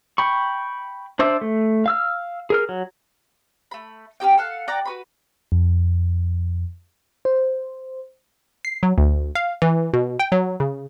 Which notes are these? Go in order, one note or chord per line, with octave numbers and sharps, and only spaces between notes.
G5 B5 C#6
D4 C5 D5 E5
A3
F5 E6 F6
G#4 A#4 F6
F#3
A3 B5
C#4 E4 G4 G5
A4 F5 F#5
D5 F#5 G5 A#5
F#4 B4 B5
F2
C5
C7
F#3
D2
F5
E3
B2
G5
F#3
C#3